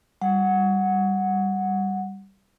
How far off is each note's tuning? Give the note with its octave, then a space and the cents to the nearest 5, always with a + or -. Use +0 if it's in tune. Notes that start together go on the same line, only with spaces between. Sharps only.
G3 +0 F#5 -10